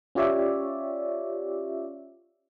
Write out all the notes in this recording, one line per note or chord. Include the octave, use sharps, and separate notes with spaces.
C#4 F4 G4 C#5 D5 E5